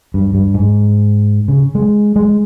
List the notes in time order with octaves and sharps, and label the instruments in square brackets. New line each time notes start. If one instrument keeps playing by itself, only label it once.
[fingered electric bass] G2
G2
G#2
C#3
G#3
G#3